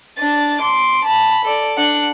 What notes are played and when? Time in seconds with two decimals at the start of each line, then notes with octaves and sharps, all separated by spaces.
0.18 D4 A6
0.61 C6 D6
1.05 A5 B5
1.45 A4 D5
1.77 D4 F#5